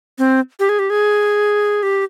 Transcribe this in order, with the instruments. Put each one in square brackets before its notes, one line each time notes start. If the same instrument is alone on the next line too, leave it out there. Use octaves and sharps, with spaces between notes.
[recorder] C4
G4
G#4
G4
G#4
G4